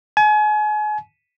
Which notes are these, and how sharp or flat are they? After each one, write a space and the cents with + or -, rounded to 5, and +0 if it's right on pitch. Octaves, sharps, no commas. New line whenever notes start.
G#5 +35